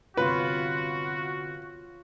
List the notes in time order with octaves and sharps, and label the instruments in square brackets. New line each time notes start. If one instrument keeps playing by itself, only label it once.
[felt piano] G1 C3 C6 [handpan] F4 C#5 [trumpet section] F#4 [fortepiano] B4